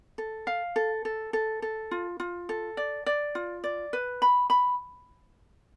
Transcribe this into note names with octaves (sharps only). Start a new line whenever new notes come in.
A4
F5
A4
A4
A4
A4
F4
F4
A4
D5
D5
F4
D5
B4
B5
B5